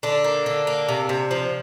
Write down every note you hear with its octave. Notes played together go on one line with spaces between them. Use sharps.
D3 D4
A#3
D3
A#3
C3
C3
F3